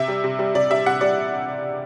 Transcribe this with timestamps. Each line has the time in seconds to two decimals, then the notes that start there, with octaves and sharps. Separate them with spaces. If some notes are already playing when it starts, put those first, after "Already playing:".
Already playing: C3 E5
0.08 G3
0.24 C3
0.39 G3
0.55 C3 D5
0.70 G3 E5
0.86 C3 F#5
1.01 G3 D5